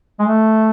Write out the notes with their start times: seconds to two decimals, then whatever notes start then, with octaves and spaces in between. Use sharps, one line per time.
0.19 G#3
0.22 A3